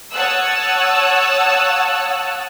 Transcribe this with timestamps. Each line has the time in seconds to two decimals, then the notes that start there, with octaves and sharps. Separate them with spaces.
0.13 C#5 F#5 A5 D#6 E6 F#6